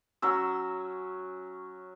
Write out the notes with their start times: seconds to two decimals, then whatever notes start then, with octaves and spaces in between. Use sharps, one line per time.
0.22 F#3 C#4 E6